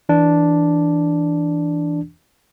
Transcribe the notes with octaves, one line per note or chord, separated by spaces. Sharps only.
E3 D4